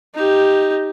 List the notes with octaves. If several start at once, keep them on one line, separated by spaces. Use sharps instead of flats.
D#4 G4